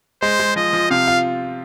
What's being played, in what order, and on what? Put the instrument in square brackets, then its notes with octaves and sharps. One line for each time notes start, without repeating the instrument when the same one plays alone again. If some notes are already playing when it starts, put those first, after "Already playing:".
[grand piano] G#3 [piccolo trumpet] C5
[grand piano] G#3
[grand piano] F3 [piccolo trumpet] D#5
[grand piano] F3
[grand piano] C3 [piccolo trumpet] F5
[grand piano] F4